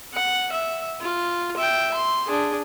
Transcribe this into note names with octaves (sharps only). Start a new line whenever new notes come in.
F#5
E5
F4
E5 G5
C6
D4 G#4